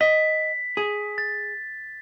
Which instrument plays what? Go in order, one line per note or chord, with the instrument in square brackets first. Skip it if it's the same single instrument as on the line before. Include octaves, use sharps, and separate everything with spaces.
[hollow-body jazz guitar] D#5 [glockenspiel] B6
[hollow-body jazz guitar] G#4
[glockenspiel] A6